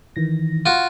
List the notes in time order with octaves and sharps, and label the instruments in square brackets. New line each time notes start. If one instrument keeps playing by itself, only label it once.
[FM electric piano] D#3 E3 A#6
[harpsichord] F4 F#4